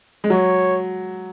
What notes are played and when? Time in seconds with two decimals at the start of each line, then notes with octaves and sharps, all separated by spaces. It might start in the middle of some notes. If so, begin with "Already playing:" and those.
0.24 G#3
0.30 F#3 C#5